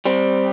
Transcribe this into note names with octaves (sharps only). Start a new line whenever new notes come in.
G3 C4